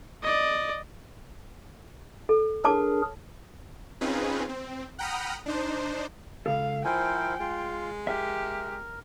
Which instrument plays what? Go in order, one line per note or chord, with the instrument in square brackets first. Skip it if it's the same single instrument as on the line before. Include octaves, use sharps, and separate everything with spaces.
[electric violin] D5 D#5
[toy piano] A4
[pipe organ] D4 G#4 A#4 [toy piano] C#5 A5 D6
[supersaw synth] C4 C#4 D#4 F4 G#4 B4
C4
F#5 G5 A#5 B5 D#6 F6
D4 D#4 C5
[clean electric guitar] C#2 A4 [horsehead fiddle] F5
[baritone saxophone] F3 [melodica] E4 A#4 C5 [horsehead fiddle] G5 [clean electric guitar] G#5
[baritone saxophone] G#3 [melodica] F4
[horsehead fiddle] G4 [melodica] A#4 [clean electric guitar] E5